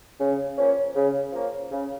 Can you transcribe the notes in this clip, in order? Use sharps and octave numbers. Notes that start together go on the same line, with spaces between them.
C#3
F3 A#3 C#4
C#3
F3 A#3 C#4
C#3